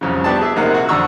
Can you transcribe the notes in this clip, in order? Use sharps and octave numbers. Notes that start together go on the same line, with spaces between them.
C2 F2 C#3
B3 D4 G4 A5
G#4 E5
A#1 C3 G#3 A#3 D#4 F#5
F#4
F2 D3 D4 A#5 C#6 E6